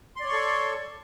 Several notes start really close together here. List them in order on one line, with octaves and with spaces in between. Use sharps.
C6 D5 C#5 C#6 A4